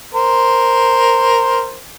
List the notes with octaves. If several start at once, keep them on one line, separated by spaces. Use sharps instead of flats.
A#4 C5